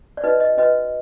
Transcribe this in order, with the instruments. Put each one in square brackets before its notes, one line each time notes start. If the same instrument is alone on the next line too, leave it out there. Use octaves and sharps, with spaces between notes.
[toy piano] D5
D#4 F#4 B4 D#5
D#5
C#4 F#4 B4 D#5